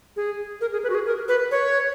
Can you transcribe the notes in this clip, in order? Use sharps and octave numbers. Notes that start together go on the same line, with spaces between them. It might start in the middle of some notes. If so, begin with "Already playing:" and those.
G#4
A#4
G#4
B4
F#4
G#4
A#4
B4
C#5